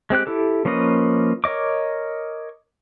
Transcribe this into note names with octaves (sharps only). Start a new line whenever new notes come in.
G#3 C4 G4 F#6
E4 G4 A4
F3 A#3 C#4 B4 D#5
A#4 C#5 D#5 D6